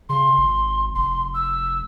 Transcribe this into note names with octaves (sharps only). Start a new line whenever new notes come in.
C#3 C6
G#1
F1 C6
E6